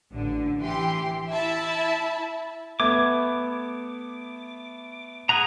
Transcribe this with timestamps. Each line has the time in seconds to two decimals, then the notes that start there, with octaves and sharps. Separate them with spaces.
0.12 A1 D3
0.59 E3 G4 C6
1.29 E4 E5 A5 B5
2.80 A3 B3 D6 G#6
5.29 G#4 F#5 A#5